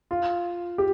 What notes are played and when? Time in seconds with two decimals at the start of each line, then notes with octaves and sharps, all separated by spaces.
0.11 F4
0.78 G4